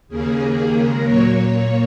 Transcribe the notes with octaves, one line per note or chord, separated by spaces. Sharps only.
D#2 C#3 A#3 G#4
D#2 D#3 A#3 G#4
D#2 C#3 G#3 A#4
A#2 F#3 A#3 C#5
A#2 A#3 C#5